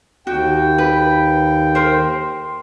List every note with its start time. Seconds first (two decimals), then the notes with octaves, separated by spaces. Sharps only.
0.27 D#2 F#4 G5
0.78 B4
1.75 A#4 C5